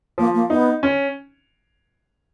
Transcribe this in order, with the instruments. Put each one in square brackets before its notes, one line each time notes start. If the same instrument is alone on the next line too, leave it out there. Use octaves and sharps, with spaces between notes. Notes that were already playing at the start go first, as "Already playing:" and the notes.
[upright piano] F3 [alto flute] A#3
[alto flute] A#3
[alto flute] B3 [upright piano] D#4
[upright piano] C#4